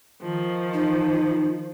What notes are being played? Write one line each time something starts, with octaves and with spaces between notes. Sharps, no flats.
D#3 F3
D#4